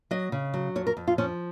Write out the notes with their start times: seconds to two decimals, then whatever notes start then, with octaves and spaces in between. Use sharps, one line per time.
0.11 F#3 D#5
0.32 C#3
0.54 F#3
0.76 F2 C#5
0.87 A#4
0.97 F2
1.07 F4
1.18 F3 C#4